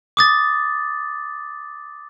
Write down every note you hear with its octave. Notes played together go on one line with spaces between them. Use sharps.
D6 D#6 A6